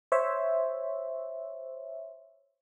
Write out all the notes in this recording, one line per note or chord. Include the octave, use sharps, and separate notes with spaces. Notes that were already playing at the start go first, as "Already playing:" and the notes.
C5 C#5 E5